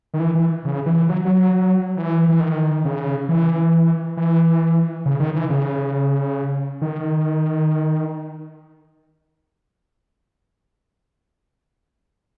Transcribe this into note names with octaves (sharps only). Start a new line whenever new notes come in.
D#3
E3
E3
C#3
E3
F#3
F#3
E3
E3
D#3
C#3
E3
E3
C#3
D#3
E3
C#3
D#3